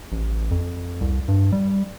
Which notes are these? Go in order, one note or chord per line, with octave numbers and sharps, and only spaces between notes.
A1
F2
C2
G2
G3